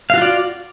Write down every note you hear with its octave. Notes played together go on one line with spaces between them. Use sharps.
F4 F#4 D5 F5